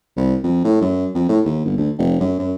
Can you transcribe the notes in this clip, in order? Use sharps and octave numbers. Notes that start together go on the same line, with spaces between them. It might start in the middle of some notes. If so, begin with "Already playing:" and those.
C2
F2
A2
F#2
F2
A2
D#2
G1
D2
F1
F#2
F#2